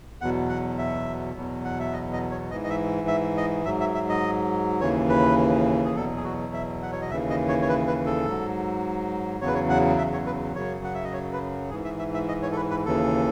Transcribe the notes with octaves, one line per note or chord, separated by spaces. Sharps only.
E2 B2 F#3 F#5
F#5
E5
E2 B2 F#3
F#5
E5
D#5
D#5
C#5
G#2 E3 D#5
D#5
E5
E5
D#5
G#2 F#3 E5
E5
E5
D#5
D#2 C#3 E3 C#5
B4
G#4
E2 B2 F#3 A4
G#4
F#4
E5
F#5
C#5
D#5
D#2 C#3 E3 E5
D#5
C#5
C#5
B4
B4
A4
G#2 F#3
E2 C#3 F#3 C#5
B4
C#5
F#5
E5
C#5
B4
F#2 C#3 F#3 C#5
F#5
E5
D#5
C#5
B4
G#2 E3 G#4
E5
E5
E5
D#5
C#5
A4
B4
B4
D#2 C#3 E3 A4